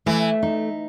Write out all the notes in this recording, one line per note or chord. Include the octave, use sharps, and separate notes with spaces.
E3 A3
D#4